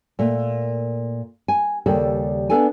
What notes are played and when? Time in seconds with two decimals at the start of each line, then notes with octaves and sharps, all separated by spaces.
0.19 A#2 A3
1.48 G#5
1.86 D#2 C#3 G3 G#4 A4 D5
2.50 B3 D4 A4 D5 G#5